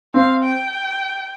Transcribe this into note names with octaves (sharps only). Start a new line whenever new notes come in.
C4 F5
G5